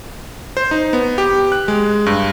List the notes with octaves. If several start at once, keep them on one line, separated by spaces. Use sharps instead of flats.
C5
D#4
B3
G4
F#6
G#3
G2